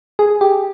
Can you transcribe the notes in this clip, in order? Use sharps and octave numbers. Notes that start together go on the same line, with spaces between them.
G#4
G4